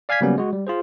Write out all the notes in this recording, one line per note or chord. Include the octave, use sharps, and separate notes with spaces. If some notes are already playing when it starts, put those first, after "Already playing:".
D5 F5 G#5 F6 G#6 B6
C#3 F#3 G3 A#3 B3 C#4
G#3 F#4
G3
F4 G#4 C5